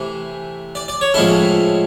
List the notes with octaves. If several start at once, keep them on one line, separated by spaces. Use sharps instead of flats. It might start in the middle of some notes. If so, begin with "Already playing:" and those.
Already playing: C3 E3 A3
D5
D5
C#5
A2 F3 G#3 C#4 E4 A4